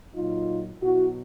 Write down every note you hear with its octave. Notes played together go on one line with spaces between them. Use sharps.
A#2 F#3 D#4 F4
B2 F#3 E4 F#4